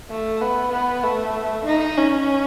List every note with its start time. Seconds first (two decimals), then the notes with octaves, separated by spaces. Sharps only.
0.11 A3
0.41 B3
0.72 B3
1.03 A3
1.66 D#4
1.97 C#4